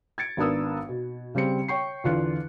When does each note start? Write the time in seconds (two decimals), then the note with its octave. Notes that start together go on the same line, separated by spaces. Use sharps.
0.18 G#6 A6 C#7 D7
0.37 G#1 B3 D4 A#4 D#6 E6
0.89 B2
1.35 C#3 G3 C4 C#7
1.68 C#5 G5 C#6 C7
2.04 E2 D3 F4 F#6 C#7